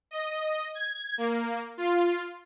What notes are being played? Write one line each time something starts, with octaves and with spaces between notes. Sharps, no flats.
D#5
G#6
A#3
F4